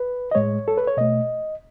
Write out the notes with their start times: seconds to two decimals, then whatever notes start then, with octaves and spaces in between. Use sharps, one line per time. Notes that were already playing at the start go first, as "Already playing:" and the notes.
Already playing: B4
0.31 D#5
0.35 A2 G#3 C#5
0.68 A4
0.77 B4
0.87 C#5
0.97 B2 A3 D#5